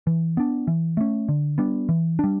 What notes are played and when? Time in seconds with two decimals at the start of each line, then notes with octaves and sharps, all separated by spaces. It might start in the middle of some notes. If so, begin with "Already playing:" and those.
0.07 E3
0.37 B3 D4
0.67 E3
0.97 A3 C#4
1.29 D3
1.58 G3 B3 D4
1.89 E3
2.19 G3 D4